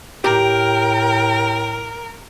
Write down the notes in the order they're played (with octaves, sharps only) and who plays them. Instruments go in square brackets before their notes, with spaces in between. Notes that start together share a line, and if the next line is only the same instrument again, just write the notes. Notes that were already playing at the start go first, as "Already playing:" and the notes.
[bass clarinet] A2 [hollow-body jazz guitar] G4 A#5 [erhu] A#4 [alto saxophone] G5